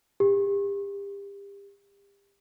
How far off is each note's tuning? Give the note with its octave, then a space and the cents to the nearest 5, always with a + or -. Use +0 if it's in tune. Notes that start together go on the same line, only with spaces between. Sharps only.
G4 +35